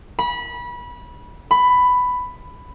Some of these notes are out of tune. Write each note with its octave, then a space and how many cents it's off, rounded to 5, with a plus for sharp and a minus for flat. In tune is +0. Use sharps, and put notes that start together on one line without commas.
B5 -25
B5 +10